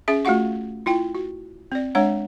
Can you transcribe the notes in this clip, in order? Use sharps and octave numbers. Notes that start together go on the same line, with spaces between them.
C#4 G#4 E5
A3 F4 F#4 F5 F#5 C#6
E4 F4 G5
F#4
C4 D5
G#3 D4 C#5 F#5